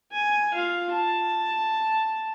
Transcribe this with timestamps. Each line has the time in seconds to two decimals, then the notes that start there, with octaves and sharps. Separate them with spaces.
0.12 G#5
0.53 F4 F5
0.92 A5